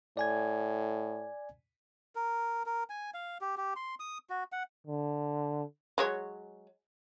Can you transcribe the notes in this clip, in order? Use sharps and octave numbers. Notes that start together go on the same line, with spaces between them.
A2 D5 G#5 G#6
A#4
A#4
G#5
F5
G4
G4
C6
D#6
F#4
F#5
D3
F#3 G#3 C#5